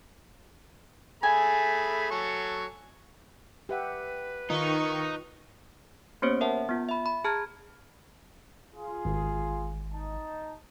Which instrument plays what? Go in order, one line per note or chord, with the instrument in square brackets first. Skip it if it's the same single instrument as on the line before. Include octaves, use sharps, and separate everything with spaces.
[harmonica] A3 G#4 B5 [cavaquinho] G#5
[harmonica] F#3 A4 C#6
[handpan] G4 E5 F#5 [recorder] B4
[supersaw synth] D#3 C#6 [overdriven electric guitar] D#4 [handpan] F4
[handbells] A#3 B3 C#4 G4 C5 C#5
A#4 E5 F#5 A5
B3 F4
E5 B5
B5
G#4 A5 A#5 F6 G#6
[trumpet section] F4 G#4
[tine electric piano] G#1
[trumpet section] D#4 A5